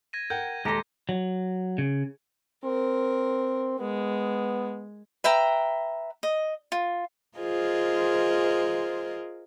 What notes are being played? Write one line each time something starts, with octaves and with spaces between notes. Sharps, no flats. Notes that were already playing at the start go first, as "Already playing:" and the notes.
G#6 A#6 D#7
A#4 F#5 G5 G6
D#1 G#3 G4 A4 A#5 C6 A#6
F#3
C#3
C4 A#4
G#3 B3
B4 E5 G5 A#5
D#5
F4
F4 G#4 A#4 C5 D#5